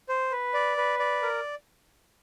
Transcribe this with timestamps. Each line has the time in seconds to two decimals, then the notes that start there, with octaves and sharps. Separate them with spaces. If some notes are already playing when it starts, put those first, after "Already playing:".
0.09 C5
0.32 B4
0.54 D5
0.77 B4
0.99 D5
1.22 A#4